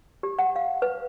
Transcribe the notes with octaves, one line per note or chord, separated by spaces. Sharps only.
G4
F#5
F5
B4